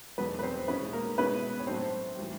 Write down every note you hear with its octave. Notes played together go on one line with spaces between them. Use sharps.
E2 B2 F#3 A3 B3 B4
B4
C4 C5
B2 G#3 B3 C#4 E4 B4
A#3 A#4
B2 G#3 B3 C#4 E4 B4
C#5
A2 F#3 A3 C4 D4 C5
A2 E3 G3